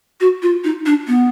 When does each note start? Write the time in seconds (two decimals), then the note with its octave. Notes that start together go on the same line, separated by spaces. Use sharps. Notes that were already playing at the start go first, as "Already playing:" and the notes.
0.20 F#4
0.42 F4
0.64 D#4
0.86 D4
1.07 B3